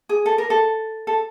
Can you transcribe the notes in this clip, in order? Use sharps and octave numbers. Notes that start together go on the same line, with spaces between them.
G#4
A4
A#4
A4
A4